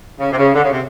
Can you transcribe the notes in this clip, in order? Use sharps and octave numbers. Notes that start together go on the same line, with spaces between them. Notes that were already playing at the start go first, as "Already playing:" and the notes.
C#3
C3
C#3
D3
C#3
C3